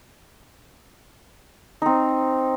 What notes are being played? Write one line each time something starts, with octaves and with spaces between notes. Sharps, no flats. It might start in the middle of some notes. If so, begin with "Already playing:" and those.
C4 D#4